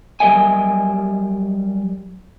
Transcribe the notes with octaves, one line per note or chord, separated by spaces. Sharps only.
F#3 G3 A#4 D#5 E5 G#5